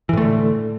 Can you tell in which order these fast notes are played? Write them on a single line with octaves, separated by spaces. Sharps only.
E3 A2 A3 D3